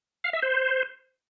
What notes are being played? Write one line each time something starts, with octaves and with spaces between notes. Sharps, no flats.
F5
E5
C5